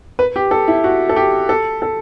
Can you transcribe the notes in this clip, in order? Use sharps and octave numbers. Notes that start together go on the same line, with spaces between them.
B4
G4
A4
E4
F#4
A4
G4
A4
A4